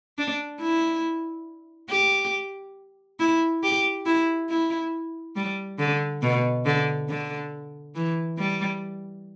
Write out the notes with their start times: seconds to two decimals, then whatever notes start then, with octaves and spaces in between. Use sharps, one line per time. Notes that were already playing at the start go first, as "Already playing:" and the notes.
0.18 D4
0.61 E4
1.90 G4
3.20 E4
3.63 G4
4.06 E4
4.49 E4
5.36 G3
5.79 D3
6.22 B2
6.66 D3
7.09 D3
7.95 E3
8.39 G3